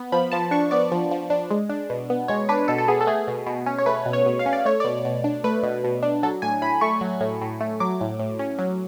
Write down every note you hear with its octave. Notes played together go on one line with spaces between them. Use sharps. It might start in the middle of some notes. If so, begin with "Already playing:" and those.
Already playing: B3
F3 B5
F3 A5
D4 C#6
B3 D5
F3
F3
D4
G#3
D4
B2
B3
G#3 C#5
D4 B4
B2 A4
A4
B3 G#4
A4
A3 G#4
B2
B2
C#4
C#5
A3 B4
B2
C#5
B2
F5
C#4
D5
A3 C#5
B2 D5
B2
D4
A3 B4
B2
B2
D4
F#3 A4
A2 G#5
A2 B5
A3 C#6
F#3
A2
A2
A3
F#3 D6
A2
A2
C#4
F#3